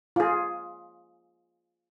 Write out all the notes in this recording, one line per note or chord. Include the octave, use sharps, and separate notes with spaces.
F4 G#4